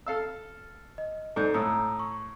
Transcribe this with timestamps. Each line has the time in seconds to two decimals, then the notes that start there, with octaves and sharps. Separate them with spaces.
0.06 A4 F5 E6
0.98 D#5
1.36 G#2 A4 D5 G6
1.54 A2 A#5 D#6 E6
1.99 C#6